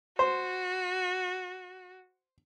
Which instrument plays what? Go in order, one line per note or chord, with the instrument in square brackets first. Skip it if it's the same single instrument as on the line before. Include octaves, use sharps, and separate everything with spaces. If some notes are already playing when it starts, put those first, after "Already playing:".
[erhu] F#4 [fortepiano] C5